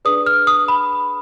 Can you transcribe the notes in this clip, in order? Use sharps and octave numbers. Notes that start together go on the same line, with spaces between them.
D4 G#4 B4 D5 D#6
F6
D#6
B5